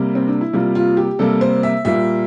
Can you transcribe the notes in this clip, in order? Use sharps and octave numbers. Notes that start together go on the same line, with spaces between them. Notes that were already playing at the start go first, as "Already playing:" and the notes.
Already playing: C3 G3 A#3
C4
D4
E4
C3 G3 A#3 F4
F4
G4
C3 G3 A#3 A4
C5
E5
A#2 G3 A#3 E5